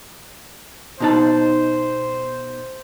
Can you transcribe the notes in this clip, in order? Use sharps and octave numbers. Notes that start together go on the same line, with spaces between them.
B2 D#4 C5 A5